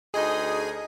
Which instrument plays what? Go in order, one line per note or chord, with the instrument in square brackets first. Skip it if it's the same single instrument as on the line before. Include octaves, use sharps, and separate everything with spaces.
[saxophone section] D2 D#4 D#5 [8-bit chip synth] G#4 G#5